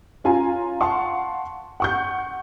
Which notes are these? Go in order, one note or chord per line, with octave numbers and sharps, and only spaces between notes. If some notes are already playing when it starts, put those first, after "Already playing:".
C#4 F4 G#5 A#5
F5 F#5 A5 C6 C#6
F#5 C#6 G6